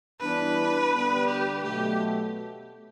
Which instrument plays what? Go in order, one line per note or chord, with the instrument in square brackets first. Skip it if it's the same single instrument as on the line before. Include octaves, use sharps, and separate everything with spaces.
[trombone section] G2 E3 B3 D4 [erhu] B4
[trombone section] G2 D3 G3 B3
[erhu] G4
[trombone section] B2 F#3 A3 [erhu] G4